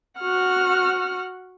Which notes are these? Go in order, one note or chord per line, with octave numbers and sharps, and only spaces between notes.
F#4 F#5 F6